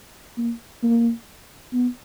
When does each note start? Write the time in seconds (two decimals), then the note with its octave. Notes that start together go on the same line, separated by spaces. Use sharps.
0.38 A#3
0.83 A#3
1.73 B3